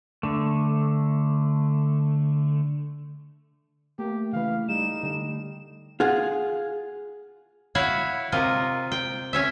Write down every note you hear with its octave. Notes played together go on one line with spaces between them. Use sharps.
D3 A3
A3 A#3 G4
C#3 E3 B4 F5
G3 D#4 E7
D3 G3 D4
F4 G#4 F#5
E4 F#4 C#5 F5
C3 F4 A#4 D#5
G5
C#4 C#5 E5